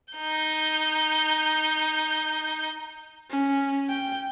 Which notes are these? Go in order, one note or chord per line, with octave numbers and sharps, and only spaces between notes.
D#4 G6
C#4
G5